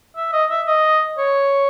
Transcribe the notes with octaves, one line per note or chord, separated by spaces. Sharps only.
E5
D#5
E5
D#5
C#5